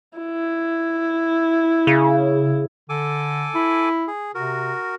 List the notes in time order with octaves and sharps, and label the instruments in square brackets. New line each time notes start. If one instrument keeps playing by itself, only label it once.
[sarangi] E4
[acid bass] C#3
[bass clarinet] D3 [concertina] A4 G#5 D6
[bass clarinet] E4
[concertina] G#4
[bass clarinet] C3 [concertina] F#4 A#4